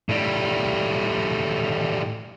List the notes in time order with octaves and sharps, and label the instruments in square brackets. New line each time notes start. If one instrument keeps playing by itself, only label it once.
[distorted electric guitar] A2 G3